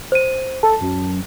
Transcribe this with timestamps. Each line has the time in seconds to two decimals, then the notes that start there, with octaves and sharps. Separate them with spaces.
0.12 C5 D#7
0.63 A4 A5
0.81 F#2